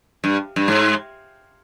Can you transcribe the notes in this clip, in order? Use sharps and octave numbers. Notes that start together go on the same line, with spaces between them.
G2
G2
G#2